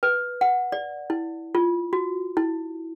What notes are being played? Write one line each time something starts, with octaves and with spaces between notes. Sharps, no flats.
B4
F#5
D5
E4
F4
F#4
E4